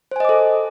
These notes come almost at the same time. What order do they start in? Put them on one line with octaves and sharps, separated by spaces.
C5 G#5 D#5 D6 A4